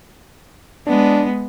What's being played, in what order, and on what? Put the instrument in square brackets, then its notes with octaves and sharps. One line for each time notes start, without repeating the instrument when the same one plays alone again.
[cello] G#3 B3 [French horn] D4